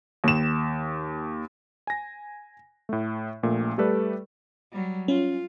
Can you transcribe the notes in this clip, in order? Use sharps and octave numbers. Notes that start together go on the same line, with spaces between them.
D#2 E7
G#5 A#6
A2 A3
A#1 A#2 A3
G3 A3 G4 A4 B4 D5
F#3 G3
C#4 F4